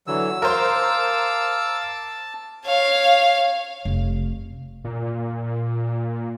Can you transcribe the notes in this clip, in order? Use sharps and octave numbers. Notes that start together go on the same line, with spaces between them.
D3 E3 F#3 E6
A#4 C5 F5 A5 D6
C#5 F5
F1
A#2